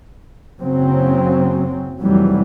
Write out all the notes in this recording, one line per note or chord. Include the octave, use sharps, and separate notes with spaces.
F#1 C#3 F#3 C4
F1 E3 F#3 G3